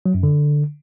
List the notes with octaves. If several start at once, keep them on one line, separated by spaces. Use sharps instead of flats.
F#3
F#2
D3